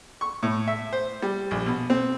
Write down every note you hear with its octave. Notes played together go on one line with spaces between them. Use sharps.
C#6
A2
E5
C5
G3
A#1
B2
C4